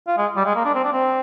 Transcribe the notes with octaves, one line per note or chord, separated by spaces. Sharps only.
F4
G#3
G3
G#3
A#3
D4
C4
D4
C4